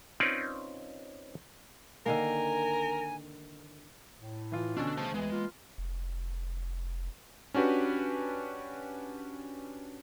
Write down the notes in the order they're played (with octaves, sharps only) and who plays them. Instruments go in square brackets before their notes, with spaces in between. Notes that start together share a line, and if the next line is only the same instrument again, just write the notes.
[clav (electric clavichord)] C4 C#4 D#4 F4 B4 D5
[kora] D3 D#3 A#3 [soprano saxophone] A#4 [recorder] G#5
[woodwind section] A2
[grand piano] E3 F4
[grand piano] B2 D3 [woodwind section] C#4 [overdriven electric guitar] D4
[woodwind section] C#3 A3 C#4 [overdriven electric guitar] C5 A5
[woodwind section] D2 E3 [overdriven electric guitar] G#3 [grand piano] B3
[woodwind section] E3 A#3 F4
[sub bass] F1
[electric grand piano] C#4 D4 F#4 G4 B4